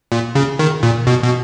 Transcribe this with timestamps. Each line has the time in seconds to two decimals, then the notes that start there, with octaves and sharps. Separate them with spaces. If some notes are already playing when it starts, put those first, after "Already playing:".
0.12 A#2
0.35 C#3
0.59 D#3
0.83 A#2
1.07 B2
1.24 B2